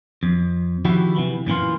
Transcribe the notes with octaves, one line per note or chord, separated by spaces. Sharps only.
F2
D#3 F3 E4 F#4 G4
C3 E3
F#2 A#2 E3 F4